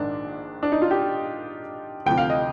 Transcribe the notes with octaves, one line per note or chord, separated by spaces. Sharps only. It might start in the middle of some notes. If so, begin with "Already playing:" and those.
Already playing: A#1 G#2 D#3 D4
D4
D#4
F4
G4
D2 C3 F3 G5
F5
D#5